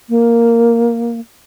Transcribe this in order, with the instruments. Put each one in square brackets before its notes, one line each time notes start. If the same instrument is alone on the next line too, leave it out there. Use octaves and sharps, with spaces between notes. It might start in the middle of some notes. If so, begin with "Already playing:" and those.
[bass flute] A#3